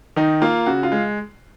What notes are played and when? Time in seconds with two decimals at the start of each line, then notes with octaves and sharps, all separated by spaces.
0.16 D#3 D#4
0.42 A#3 F4
0.66 C#3 F#4
0.83 F4
0.92 G#3